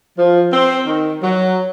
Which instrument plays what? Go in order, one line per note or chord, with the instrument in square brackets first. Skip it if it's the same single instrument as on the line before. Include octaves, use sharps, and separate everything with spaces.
[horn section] F3
C4
D#3
F#3